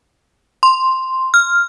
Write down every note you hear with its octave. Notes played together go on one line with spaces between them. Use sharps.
C6
F6